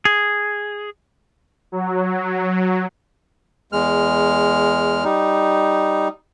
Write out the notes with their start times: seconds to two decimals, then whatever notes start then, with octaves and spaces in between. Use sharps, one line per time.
0.05 G#4
1.72 F#3
3.72 E2 G#3 F6
5.04 G3 D#4